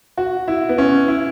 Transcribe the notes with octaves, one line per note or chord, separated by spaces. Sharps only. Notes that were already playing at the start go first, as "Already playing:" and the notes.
F#4
E4
B3
C#4
E4